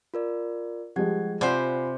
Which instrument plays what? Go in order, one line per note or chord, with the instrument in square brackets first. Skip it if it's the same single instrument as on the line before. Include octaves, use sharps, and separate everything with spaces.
[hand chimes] F4 A#4 D5
[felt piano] F3 G3 G#3 [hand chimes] G4 F#5 G#6
[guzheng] C3 C5 [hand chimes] F4 G#5 B5 [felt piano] D5 F#5